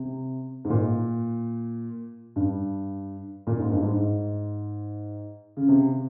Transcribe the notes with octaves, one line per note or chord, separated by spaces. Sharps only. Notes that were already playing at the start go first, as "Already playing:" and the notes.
Already playing: C3
G#2
A#2
G2
A#2
G#2
G2
G#2
C#3
C3